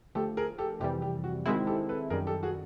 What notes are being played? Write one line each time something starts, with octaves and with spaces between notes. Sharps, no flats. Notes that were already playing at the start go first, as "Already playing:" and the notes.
D3 F3 A3 G4 A4
G#4 A#4
G4 A4
F2 C3 E3 G3 G4
G4
F#4
D#3 G#3 C4 E4 F#4 G#4
G4 A4
A4 B4
F#2 D#3 G3 G#4 A#4
G4 A4
F#4 G#4